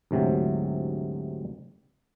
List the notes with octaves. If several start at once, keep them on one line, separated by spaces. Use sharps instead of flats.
D2 G#2 C3 E3 F#3